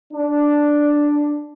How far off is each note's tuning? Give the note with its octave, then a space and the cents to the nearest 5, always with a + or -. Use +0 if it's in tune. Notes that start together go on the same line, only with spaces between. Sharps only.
D4 +0